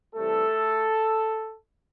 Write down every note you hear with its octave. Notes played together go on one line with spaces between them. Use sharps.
C3 E3 G3 A3 A4